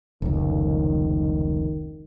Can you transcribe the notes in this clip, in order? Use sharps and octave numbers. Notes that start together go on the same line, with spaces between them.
F1 C#2 D#3